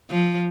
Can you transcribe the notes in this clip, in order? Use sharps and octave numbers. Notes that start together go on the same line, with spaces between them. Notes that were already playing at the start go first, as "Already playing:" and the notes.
F3